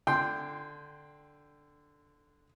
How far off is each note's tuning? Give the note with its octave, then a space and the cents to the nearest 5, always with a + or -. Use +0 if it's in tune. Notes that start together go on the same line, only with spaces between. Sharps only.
D3 +0 G5 +0 C6 +0